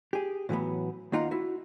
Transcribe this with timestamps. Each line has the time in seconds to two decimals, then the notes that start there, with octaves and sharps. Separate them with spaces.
0.13 G4 G#4
0.49 A2 E3 F#3 B3
1.12 D#2 A#3 D#4 F4 F#5 A#5
1.31 E4 F#4